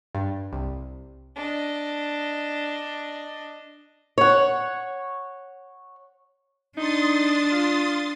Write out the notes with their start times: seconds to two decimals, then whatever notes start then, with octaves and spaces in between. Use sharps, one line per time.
0.15 G2
0.53 C2
1.36 D4 D#5
4.18 C#5 F#5
6.77 D4 D#4 C6 D#6 A6
7.52 F4